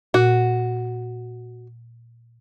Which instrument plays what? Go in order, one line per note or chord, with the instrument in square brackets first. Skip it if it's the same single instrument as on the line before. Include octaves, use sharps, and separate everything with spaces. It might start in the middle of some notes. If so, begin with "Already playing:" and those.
[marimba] A#2 [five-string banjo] F#4